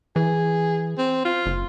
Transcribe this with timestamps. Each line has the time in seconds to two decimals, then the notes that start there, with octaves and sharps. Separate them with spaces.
0.16 E3 G#4
0.98 C4
1.25 F4
1.46 F#1